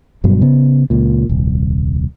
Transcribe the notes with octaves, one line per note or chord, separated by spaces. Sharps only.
F#1 G2 B2 F#3
C#3 B3
C#2 A#2
D#1 C2